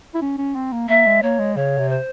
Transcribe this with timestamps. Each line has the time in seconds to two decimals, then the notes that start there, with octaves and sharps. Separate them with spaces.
0.15 E4
0.22 C#4
0.38 C#4
0.56 C4
0.72 A#3
0.89 A#3 E5
1.06 G#3
1.23 A#3 C#5
1.39 G#3
1.56 C#3 C#5
1.78 C3
1.90 C5